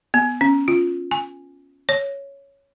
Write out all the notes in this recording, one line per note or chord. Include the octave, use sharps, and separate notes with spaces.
B3
C#4
F4
G#5
C#5